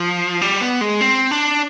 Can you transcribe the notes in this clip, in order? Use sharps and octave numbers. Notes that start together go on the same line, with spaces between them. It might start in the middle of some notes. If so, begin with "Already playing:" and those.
Already playing: F3
G3
B3
G#3
C4
D4